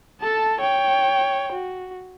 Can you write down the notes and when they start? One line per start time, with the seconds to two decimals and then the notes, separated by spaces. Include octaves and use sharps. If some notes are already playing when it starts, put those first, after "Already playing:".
0.21 A4 A5
0.61 C#5 G5
1.52 F#4